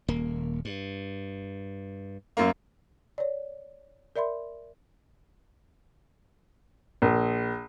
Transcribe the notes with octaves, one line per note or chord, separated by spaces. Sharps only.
D#1 A#3
G2
F#2 A#3
C#5 D5
A#4 D5 E5 B5 C6
A#1